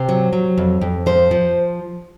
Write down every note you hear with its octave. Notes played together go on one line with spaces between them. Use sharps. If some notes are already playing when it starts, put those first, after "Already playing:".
Already playing: C3 C5
F#3
F#3
F2
F2
F3 C5
F3